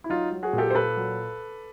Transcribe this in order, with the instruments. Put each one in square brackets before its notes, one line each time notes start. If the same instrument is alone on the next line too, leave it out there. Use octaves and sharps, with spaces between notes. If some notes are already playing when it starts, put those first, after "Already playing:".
[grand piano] E4
F#3 D#4 F4
F#3
F#4 G#4
A#2
G4 A4
C5
A#2 A4 B4
F#3